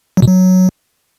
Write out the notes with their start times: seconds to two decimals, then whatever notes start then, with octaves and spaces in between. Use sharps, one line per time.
0.17 F#3
0.22 B2
0.28 F#3